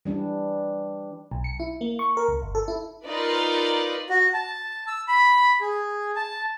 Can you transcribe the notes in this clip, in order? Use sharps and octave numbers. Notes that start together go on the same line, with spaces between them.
E3 G3 D4
B1
C#7
E4
A#3
C#6
A#4
C#2
G1
A4
E4
D#4 F4 A#4 B4 D5
F#4
A5
E6
B5
G#4
A5